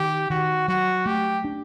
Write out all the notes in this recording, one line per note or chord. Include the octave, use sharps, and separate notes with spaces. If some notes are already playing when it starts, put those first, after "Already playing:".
Already playing: D#3 G4
D#3 F#4
F#3 F#4
A3 G4
D4